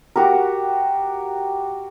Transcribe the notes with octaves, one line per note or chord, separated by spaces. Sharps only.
F#4 G4 A#4